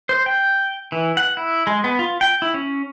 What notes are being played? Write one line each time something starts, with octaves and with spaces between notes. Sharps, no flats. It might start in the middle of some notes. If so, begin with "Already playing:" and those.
C5
G5
E3
F#5
E4
G#3
B3
F4
G5
E4
C#4